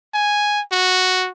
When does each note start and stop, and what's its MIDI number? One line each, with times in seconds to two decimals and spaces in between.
0.14 0.61 80
0.72 1.29 66